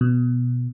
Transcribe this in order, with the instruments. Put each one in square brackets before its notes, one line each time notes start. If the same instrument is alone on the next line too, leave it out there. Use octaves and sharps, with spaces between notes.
[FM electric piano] B2